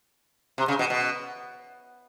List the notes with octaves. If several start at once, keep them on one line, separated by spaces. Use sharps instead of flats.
C3
C#3
B2
B2